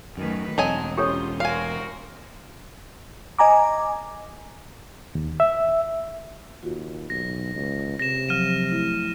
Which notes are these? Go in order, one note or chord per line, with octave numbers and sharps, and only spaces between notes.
F#2 D#3 A3 B4
E1 F#3 C4 D#5 G#5 A5
C#4 F4 G4 A4 C5 C#5
F#4 A#4 C5 F5 G#5
D#5 G#5 A#5 D6
D#2
E5
D#2 F4 F#4
B1 A#6
C#2
C3 A#6 E7
F3 F#3 F6 D#7 E7
A3 E4